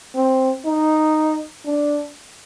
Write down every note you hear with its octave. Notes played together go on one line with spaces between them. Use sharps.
C4
D#4
D4